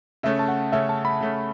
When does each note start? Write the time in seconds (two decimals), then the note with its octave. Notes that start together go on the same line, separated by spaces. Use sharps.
0.23 C#3 A3 C#4 E5
0.39 A5
0.48 F#5
0.72 C#3 A3 C#4 E5
0.89 A5
1.05 B5
1.21 C#3 A3 C#4